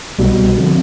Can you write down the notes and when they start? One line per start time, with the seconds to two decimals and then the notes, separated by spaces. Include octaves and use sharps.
0.19 C2 B2 G3
0.58 D3 F3 C4